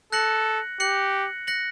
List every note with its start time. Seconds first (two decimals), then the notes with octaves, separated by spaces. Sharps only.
0.13 A4 F#6 A#6 C#7 F#7
0.80 G4 F#6 A#6 C#7 F#7
1.47 F#6 A#6 C#7 F#7